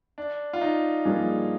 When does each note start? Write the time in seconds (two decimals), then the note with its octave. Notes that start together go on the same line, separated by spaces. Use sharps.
0.18 D4
0.53 F4
0.61 D#4
1.05 G2 F3 A#3 D4 G#4